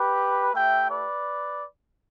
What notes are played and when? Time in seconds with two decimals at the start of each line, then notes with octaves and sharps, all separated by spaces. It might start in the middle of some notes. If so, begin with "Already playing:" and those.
Already playing: G4 B4
0.54 A3 E4 G4 E5 G5
0.90 B4 D5